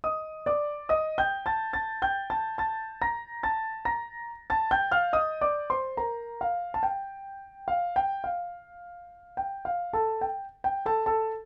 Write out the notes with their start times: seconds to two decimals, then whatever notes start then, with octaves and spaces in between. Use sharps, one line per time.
0.04 D#5 D#6
0.46 D5 D6
0.89 D#5 D#6
1.18 G5 G6
1.46 A5 A6
1.73 A5 A6
2.02 G5 G6
2.30 A5 A6
2.58 A5 A6
3.02 A#5 A#6
3.43 A5 A6
3.85 A#5 A#6
4.50 A5 A6
4.71 G5 G6
4.91 F5 F6
5.13 D#5 D#6
5.41 D5 D6
5.70 C5 C6
5.97 A#4 A#5
6.41 F5
6.74 A5
6.83 G5
7.68 F5
7.96 G5
8.24 F5
9.37 G5
9.65 F5
9.93 A4 A5
10.21 G5
10.64 G5
10.86 A4 A5
11.06 A4 A5